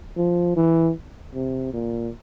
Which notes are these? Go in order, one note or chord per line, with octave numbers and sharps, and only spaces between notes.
F3
E3
C3
A#2